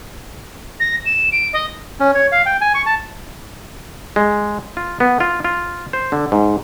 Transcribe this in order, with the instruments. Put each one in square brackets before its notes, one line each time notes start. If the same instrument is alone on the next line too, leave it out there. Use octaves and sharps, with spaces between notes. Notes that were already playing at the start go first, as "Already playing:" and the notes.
[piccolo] A#6
E7
D7
D#5
[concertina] C#4
C#5
F5
G5
G#5
C#6
A5
[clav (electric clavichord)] G#3
F4
B3
F4
F4
C5
D3
G#2